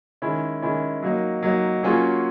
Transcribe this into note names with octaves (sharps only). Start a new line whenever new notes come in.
D#3 G#3 C#4 E4
D#3 G#3 C#4 E4
F#3 A#3 D#4
F#3 A#3 D#4
F#3 A#3 C#4 F4 G#4